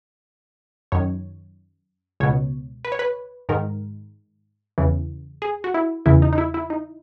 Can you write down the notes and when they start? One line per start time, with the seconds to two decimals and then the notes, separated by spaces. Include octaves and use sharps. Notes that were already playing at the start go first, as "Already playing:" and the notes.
0.92 F#2 D#3 C#5
2.20 C#2 B2 C#5
2.85 B4
2.92 C#5
2.99 B4
3.49 G#2 D#3 A#4
4.78 E2 C#3 E3
5.42 G#4
5.64 F#4
5.74 E4
6.06 E2 C#3 E3 E4
6.22 D#4
6.33 D#4
6.38 E4
6.54 E4
6.70 D#4